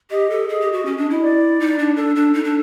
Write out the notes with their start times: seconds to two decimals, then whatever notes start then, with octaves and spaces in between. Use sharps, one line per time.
0.11 G4 D#5
0.30 A4
0.49 G#4
0.61 G4
0.73 F#4
0.86 C#4
0.97 D4
1.10 E4
1.22 D5
1.60 D#4
1.79 D4
1.96 D4 A4
2.16 D4
2.34 D#4
2.44 D4